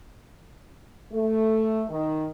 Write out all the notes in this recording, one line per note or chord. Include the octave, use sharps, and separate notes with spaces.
A3
D#3